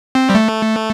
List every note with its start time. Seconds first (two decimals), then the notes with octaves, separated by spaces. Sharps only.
0.15 C4
0.30 G3
0.35 A3